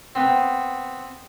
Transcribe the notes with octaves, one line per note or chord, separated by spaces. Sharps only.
B3 C4